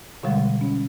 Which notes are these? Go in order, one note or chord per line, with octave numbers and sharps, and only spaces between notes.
B2 D3 G3 G#3
C#4